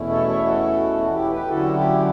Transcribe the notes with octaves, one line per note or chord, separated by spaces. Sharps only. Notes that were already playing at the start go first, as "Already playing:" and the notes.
Already playing: E2 B2 A3 C#4 E4
A4 C#5
C#5 E5
F#4 A4
F#4
E4 G4
G4 B4
D3 F#3 C#4 E4 F#4 A4
E4 G4